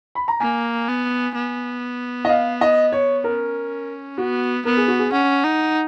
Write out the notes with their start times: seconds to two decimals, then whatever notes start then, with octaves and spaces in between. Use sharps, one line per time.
0.15 B5
0.28 A#5
0.40 A#3 G#5
0.88 B3
1.35 B3
2.25 D#5
2.29 F5
2.61 D#5
2.92 C#5
3.24 C#4 A#4
4.18 B3 F#4
4.65 B3 A#4
4.77 G#4
4.88 F#4
4.99 G#4
5.12 C#4 F#5
5.44 D#4